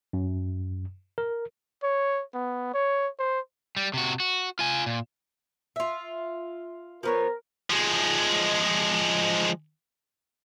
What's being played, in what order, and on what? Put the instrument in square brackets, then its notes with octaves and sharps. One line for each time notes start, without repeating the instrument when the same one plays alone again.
[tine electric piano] F#2
A#4
[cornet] C#5
B3
C#5
C5
[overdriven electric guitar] G3
C3 F#4
F#4
F4 G#5
A#2
[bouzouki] F4 E5
[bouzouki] F3 B3 C#5 [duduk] A#4
[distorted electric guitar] F3 G#3